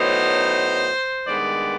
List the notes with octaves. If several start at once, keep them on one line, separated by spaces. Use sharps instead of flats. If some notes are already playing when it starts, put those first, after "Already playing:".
Already playing: A2 F#3 B3 D#4 C5
G2 D#3 G#3 B3 D5